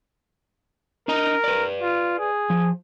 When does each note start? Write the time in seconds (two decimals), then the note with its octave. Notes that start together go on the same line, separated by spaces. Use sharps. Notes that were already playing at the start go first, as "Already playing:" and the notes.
1.08 D4 A#4 D#5 A#5
1.44 B4 D5
1.82 F4
2.19 G#4
2.50 F3